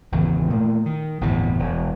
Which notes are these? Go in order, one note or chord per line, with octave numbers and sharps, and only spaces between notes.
G#1 E2 C#3 E3
A#2 A3 A#3
D#3
G1 E2 A2 C3
E1